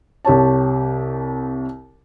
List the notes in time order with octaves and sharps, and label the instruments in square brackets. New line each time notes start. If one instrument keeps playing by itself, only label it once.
[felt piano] C2 G4 C#5 A5